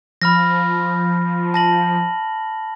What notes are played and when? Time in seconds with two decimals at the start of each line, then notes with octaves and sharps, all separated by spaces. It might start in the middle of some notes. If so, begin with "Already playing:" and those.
0.22 F3 B5 F6 A#6
1.54 A5 A#6 F#7